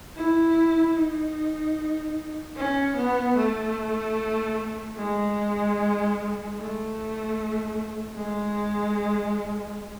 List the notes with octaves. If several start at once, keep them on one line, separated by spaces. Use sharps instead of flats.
E4
D#4
C#4
B3
A3
G#3
A3
G#3